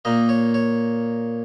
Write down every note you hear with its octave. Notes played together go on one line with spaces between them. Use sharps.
A#2 A#3 D#4 D#5
C#5
C#5